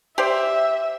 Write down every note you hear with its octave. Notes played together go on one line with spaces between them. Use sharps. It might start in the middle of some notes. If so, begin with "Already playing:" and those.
G4 C5 D5 E5